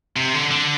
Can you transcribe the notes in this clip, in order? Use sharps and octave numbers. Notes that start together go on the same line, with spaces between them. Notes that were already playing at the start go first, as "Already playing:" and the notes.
C3
D3
D3